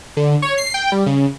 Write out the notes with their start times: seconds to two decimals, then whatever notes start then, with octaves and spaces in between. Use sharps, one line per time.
0.17 D3
0.42 C#5
0.58 C7
0.74 G5
0.92 G3
1.06 C#3